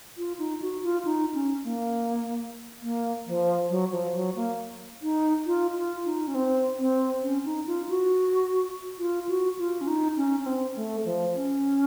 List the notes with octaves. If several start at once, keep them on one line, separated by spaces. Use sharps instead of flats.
F4
D#4
F#4
F4
D#4
C#4
A#3
A#3
F3
F#3
F3
F#3
A#3
D#4
F4
F4
D#4
C#4
C4
C4
C#4
D#4
F4
F#4
F4
F#4
F4
C#4
D#4
C#4
C#4
C4
A3
F3
C#4